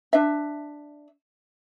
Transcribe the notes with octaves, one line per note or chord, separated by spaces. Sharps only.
D4 E5